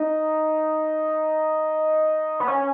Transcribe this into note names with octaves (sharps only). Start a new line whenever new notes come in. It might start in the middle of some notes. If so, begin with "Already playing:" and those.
Already playing: D#4
B3
C#4